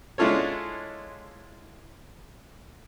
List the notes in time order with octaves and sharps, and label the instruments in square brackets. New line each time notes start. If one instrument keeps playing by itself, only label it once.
[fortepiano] G#3 D4 E4 F4 A4 C#5